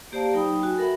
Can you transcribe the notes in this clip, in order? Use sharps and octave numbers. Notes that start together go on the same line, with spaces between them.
A#3 G4 C5 D5 F5 A5
F#3 D#4 G5 B5 D#6
F#4 G#5
A4 A#4 E5 F#5 B5